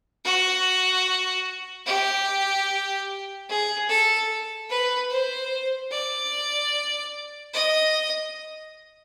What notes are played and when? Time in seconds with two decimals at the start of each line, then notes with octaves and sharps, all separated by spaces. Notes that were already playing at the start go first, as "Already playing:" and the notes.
0.25 F#4
1.86 G4
3.49 G#4
3.89 A4
4.69 B4
5.10 C5
5.91 D5
7.54 D#5